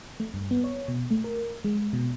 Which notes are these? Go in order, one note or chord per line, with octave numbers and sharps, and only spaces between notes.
A3
G2
B3
C#5
B2
A3
A#4
G#3
B2